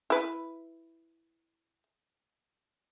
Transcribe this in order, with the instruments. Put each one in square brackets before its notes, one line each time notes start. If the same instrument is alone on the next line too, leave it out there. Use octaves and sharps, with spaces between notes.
[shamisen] E4 B4